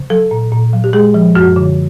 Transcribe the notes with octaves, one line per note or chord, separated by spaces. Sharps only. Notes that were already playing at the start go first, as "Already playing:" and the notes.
Already playing: C#3
F#3 A4
A#2
A#2
F#3
G4
G#3 G#4
F3
F#2 F#4
D3